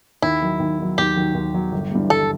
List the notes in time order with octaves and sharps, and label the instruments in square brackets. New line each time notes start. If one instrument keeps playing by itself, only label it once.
[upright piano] D#2 [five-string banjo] E4
[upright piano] D#3 F#3
D#2
D#3 F#3
[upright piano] D#2 [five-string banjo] G4
[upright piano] D#3 F#3
D#2
D#3 F#3
G1
G2 E3 G3
[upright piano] G1 [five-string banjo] A4